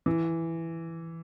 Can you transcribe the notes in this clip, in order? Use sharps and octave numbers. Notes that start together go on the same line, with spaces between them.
E3